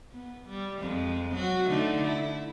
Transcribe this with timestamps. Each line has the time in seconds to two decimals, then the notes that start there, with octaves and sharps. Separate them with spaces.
0.12 B3
0.49 G3
0.81 F2 G#3
1.35 F#3 F#4
1.68 D3 A3 D#4
2.03 E4